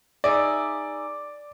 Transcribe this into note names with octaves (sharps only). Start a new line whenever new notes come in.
D#4 G#4 D5 E5